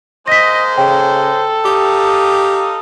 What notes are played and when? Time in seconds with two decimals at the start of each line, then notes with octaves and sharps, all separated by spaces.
0.28 G#3 A#3 C5 D#5 A#6 B6
0.78 C#3 A4 G5
1.65 D#4 G4 F5 D#6